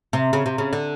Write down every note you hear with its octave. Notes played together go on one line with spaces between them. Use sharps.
C3
C#3
C3
C#3
D3